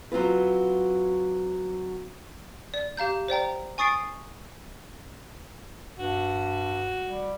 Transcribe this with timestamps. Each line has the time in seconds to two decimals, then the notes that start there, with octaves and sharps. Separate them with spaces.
0.12 F#3 C4 F4 B4
2.74 D5
2.97 G4 F5 A#5 G6
3.28 C5 D5 G5 A#5
3.78 G#5 C#6 D#6 A6 C7 D7
5.98 G2 F#4
7.04 G3